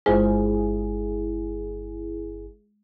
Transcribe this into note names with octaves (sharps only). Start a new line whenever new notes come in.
G1 G#3 E4 F4 G#4 C5